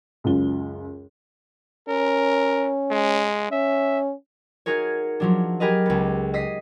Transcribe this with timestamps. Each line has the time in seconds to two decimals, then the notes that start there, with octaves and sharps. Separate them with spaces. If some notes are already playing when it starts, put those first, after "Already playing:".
0.24 C#2 F#2 F4 G7
1.89 C#4 A#4
2.91 G#3
3.52 C#4 E5
4.66 D#4 F#4 G#4 A#4 C#5
5.20 F3 F#3 D4
5.60 G4 G#4 A#4 B4 D#5
5.86 C#2 B3
6.34 D#5 D#6 B6 C7